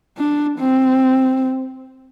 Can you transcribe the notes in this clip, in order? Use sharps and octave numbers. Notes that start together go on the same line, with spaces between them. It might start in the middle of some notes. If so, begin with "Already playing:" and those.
D4
C4